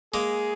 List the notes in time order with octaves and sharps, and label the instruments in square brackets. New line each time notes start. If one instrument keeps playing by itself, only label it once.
[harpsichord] G#3 A#3 [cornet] G#4